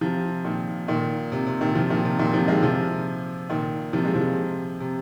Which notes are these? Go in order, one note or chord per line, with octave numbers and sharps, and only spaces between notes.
C3 F3
A#2 D#3
A#2 D#3
C3
C3
A#2 D#3
C3 F3
A#2 D#3
C3
A#2 D#3
C3 F3
D#3 G#3
C3 F3
A#2 D#3
C3 F3
G#3
C3 F3
C3